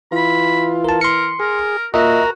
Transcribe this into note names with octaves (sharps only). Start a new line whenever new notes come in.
E3 F4 B5
A#4 A5
A#4 C6 C#7
G#4 A#4
A#2 F#4 A#4 D#5 E5 A#5